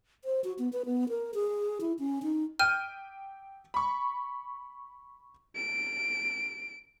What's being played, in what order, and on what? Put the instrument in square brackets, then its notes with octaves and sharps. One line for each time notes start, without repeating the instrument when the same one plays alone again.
[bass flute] C5
F#4
B3
B4
B3
A#4
G#4
E4
C#4
D#4
[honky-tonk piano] G5 G6 D#7 [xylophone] F6
[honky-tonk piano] B5 C#6
[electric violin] D7